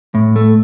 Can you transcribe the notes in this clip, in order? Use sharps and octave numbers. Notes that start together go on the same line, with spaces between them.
A2
A3